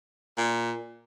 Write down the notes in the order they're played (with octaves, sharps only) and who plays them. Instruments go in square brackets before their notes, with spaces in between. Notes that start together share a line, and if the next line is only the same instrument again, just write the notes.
[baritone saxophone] A#2